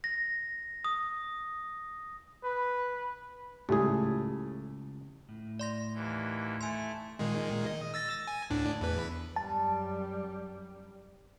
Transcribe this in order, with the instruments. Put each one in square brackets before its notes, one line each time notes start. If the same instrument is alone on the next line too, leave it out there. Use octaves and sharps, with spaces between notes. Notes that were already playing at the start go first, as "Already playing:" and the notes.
[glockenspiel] A#6
D#6
[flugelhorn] B4
[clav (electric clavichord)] C#2 G#4 [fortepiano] A2 G3 A3
[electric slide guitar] A2
[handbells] D5 C6 A#6
[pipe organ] D#2 E3
[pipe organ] A3 E4 [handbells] G#5 C6
[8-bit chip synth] A#2 D#3 G#3
D#5
E6 A6 A#6
G#5
D2 A2 D4
E2 B4
[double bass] F#2 G3 [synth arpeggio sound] A5